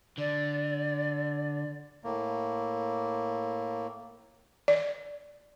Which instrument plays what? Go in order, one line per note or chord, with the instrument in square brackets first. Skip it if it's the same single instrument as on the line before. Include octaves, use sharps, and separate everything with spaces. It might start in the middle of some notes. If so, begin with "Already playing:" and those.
[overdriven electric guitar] D3 [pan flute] D5
[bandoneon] A2 A#3
[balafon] D5